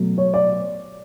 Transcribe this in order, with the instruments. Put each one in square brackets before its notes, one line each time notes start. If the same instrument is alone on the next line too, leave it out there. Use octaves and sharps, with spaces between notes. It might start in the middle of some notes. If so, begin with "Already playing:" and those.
Already playing: [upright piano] B2 F#3 A3
C#5
D5